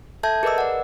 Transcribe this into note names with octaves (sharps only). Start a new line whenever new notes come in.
A4 E5 A5 G6 G#6
G#4 A#4 B4 D#5 D6 E6
D5 F#5